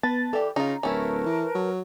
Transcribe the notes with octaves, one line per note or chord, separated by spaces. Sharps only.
B3 B4 A5 A6
E3 G4 A4 D5
C#3 D#4 F4 A#5
D1 A3 C#4 E4 A#4 B4 A5
E3
F#3